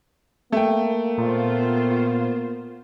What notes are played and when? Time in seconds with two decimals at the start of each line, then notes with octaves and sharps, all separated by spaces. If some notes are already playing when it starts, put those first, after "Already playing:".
0.52 A3 A#3 G5
1.18 A#2 B3 F4 C5